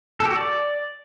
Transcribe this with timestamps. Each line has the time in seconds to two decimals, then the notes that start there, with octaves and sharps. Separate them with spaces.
0.20 A4
0.25 G4
0.31 F#4
0.36 D5